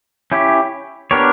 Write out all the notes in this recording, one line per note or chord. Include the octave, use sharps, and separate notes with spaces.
C#4 E4 G4
B3 D4 G4 A#4 C#5